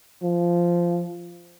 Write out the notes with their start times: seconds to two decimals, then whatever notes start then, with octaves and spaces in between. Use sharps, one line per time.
0.23 F3